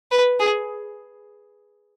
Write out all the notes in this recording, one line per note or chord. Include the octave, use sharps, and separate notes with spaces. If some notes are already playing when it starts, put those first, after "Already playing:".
B4
G#4